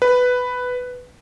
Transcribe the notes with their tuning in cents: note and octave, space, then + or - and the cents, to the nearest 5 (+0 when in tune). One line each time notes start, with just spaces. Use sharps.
B4 +5